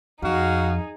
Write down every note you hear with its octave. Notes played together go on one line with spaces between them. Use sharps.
F2 D#4 F#4 G#4 F5